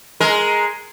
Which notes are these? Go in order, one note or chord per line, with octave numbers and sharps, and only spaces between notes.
G#3 A#4